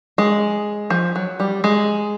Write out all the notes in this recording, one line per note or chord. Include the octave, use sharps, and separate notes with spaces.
G#3
F3
F#3
G3
G#3